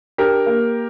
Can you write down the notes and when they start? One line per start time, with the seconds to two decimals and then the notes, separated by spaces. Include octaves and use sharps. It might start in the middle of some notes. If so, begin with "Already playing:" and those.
0.18 D4 G4 A#4
0.46 A#3